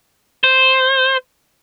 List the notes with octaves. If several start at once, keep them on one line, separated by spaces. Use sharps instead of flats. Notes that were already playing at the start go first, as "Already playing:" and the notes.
C5